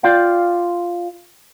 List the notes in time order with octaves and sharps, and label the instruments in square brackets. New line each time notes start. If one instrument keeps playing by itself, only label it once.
[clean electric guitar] F4 D5 F5 G5